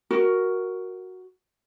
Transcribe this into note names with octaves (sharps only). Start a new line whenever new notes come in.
F#4 A#4